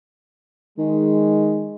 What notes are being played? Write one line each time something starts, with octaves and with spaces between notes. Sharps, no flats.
D#3 G#3